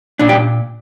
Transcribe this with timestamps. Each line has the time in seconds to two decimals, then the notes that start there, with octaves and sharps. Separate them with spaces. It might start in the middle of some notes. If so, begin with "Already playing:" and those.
0.19 A#2 D4
0.29 G4